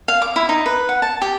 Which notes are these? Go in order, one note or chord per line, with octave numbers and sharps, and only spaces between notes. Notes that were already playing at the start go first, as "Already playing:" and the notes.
F5
D6
E4
D#4
B4
F#5
A5
G4